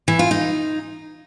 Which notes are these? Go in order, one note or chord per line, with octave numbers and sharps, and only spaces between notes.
E3
F4
D#4